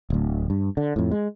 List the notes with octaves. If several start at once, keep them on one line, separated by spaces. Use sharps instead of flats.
D1 D2
G2
D3
F2 A2
G#3